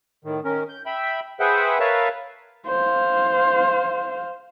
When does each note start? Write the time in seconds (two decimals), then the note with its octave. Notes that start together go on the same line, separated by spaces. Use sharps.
0.24 A2 D#3
0.45 D#3 C#4 A#4
0.69 G6
0.86 E5 G5 B5
1.40 G#4 B4 C5 E5 F#5 G5
1.80 A#4 B4 C#5 E5 F5 A5
2.67 C5 F5